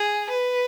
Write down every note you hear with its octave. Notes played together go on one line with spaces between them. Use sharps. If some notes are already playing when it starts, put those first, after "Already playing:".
Already playing: G#4
B4